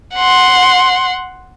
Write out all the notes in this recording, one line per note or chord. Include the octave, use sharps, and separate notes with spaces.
F#5 C6